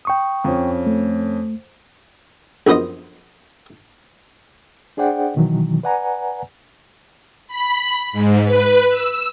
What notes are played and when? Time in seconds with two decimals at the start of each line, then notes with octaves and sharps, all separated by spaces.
0.05 G5 C#6 D#6
0.44 F2 C#4
0.86 A3
2.67 A#1 F#2 B3 C5 D#5
4.97 D4 G#4 C5 D5 F#5 G5
5.36 B2 D#3 E3 F#3
5.83 B4 D5 F#5 G#5 A#5
7.48 B5
8.12 G#2
8.45 B4
8.88 E6